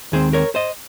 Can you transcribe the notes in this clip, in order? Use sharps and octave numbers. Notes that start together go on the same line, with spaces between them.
D#2 D#3 G#3 C4 G#4 C5
A#4 C#5
C5 D#5